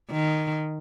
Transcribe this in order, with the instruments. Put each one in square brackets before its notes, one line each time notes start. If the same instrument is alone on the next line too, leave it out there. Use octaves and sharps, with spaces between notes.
[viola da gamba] D#3